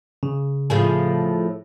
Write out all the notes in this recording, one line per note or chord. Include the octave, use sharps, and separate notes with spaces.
C#3
A2 F3 G#4